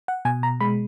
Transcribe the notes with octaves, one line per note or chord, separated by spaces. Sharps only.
F#5
B2 G#5
A#5
G#3 B5